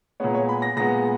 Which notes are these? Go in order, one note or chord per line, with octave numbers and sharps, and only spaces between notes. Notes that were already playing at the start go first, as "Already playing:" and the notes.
A#2 G#3 B3 C#5
C#5
B5
A#6
A#2 G#3 B3 A#6